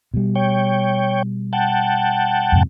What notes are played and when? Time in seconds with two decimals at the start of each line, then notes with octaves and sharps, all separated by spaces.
0.14 B2 G3
0.35 C#5 G5
1.53 F#5 G5 A5
2.52 F2 G#2 C3